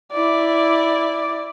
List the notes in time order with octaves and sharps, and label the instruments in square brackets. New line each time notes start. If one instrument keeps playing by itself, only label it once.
[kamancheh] E4 D5